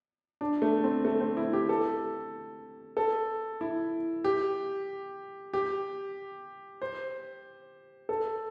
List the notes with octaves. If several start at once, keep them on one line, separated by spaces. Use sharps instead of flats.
D4
A3
C4
A3
C4
E4
G4
A4
A4
E4
G4
G4
C5
A4